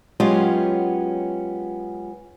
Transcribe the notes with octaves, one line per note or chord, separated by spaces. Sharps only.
F#3 G#3 B3 C#4 F4 G4